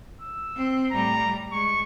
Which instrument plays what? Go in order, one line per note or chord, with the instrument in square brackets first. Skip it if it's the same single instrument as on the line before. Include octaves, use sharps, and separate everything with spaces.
[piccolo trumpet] E6
[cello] C4
[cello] A2 G3 [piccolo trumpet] A#5
[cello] G#3 [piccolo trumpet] C#6